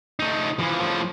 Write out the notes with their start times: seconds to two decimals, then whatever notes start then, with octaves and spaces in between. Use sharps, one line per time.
0.20 A3 D#4
0.59 E3 F3
0.80 A2 F3